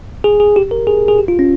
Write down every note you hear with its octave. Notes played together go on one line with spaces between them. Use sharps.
G#4
G#4
G4
A#4
G#4
G#4
G4
F4
C#4